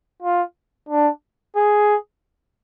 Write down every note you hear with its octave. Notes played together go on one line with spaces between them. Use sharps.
F4
D4
G#4